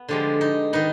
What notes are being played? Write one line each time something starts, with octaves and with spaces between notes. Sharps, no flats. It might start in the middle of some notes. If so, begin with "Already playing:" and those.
Already playing: B3
D3 F3 G#3 G4
D#4
D#3 B3 D#4